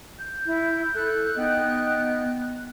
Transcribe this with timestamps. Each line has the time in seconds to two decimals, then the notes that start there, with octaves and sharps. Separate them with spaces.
0.17 G6
0.46 E4
0.95 A4 F#6
1.36 B3 D#4 D#5 G5